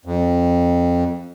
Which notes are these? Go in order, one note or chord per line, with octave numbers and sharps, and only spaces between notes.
F2